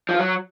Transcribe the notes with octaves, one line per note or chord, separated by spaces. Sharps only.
F3
F4
F#3